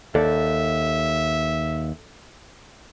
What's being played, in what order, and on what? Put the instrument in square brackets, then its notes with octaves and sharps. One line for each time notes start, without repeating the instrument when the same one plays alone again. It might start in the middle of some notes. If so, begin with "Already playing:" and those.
[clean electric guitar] D#2 [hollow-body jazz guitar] A4 D5 [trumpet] E5